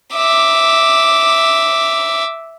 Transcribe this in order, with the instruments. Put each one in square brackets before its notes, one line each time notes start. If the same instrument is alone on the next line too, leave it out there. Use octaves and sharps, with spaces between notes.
[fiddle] E5 D6